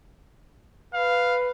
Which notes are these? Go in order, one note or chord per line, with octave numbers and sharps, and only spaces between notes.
B4 F5